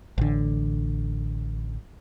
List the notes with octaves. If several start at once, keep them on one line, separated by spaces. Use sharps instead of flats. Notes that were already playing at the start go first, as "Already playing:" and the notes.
A1 D3